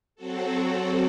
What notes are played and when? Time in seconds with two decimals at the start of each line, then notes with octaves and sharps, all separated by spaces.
0.15 F#3 C4 F#4 A4